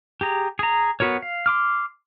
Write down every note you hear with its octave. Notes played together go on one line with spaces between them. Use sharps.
G4 G#4 A#5
G#4 A#5
B3 F#4 A#4 C#5
F5
C6 D6 F6